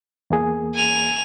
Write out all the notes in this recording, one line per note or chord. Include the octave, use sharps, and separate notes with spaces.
E2 A#3 G#4
G#5 F7